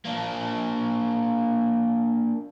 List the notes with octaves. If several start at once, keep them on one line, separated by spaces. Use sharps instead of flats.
A#3 D4